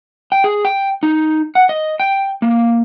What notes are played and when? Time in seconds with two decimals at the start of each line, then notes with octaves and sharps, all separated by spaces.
0.32 G5
0.44 G#4
0.65 G5
1.03 D#4
1.55 F#5
1.69 D#5
2.00 G5
2.42 A#3